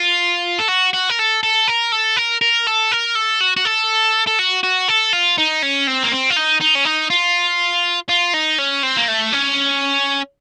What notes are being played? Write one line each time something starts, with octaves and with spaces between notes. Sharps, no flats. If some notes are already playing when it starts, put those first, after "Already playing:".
Already playing: F4
A4
F#4
F#4
A#4
A4
A4
A#4
A4
A#4
A#4
A4
A#4
A4
F#4
F#4
A4
A4
F#4
F#4
A4
F4
D#4
C#4
C4
A#3
C4
F4
D#4
D#4
C#4
D#4
F4
F4
D#4
C#4
C4
A#3
A3
C#4